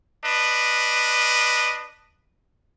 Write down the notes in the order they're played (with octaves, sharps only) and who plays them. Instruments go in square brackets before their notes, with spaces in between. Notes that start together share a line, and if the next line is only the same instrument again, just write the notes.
[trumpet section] D4 B4 D#5